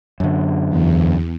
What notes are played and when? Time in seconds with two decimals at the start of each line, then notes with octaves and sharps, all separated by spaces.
0.20 F#2 D3
0.69 E2